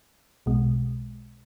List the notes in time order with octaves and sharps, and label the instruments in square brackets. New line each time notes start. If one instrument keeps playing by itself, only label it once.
[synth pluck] B1 B2 G#3